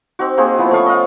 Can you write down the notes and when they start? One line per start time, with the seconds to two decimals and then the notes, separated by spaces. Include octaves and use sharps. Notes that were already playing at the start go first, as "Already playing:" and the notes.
0.19 C4 D#4 F#4
0.37 A#3 C4 F#4 G#4
0.58 F3 B3 E4
0.71 A3 C#4 F5 C#6
0.86 D#5 F5